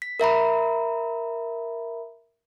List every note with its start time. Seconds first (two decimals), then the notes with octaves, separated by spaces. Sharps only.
0.02 B6
0.20 A#4 E5 A#5 B5